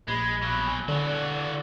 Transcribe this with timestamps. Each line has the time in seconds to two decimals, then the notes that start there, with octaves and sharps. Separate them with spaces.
0.08 A#1 G#3 B5
0.43 B2 F#3
0.65 G#5
0.88 D3 E3 F#4 D5